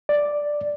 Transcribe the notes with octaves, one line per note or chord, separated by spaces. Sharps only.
D5